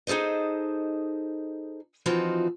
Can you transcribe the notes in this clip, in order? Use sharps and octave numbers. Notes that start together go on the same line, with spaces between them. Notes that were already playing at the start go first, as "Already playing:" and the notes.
D#4 G#4 A4 C5 D#5
E3 F3 C4 D#4 F4 F#4